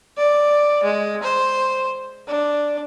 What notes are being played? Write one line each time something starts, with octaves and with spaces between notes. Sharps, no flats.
D5
G#3
C5
D4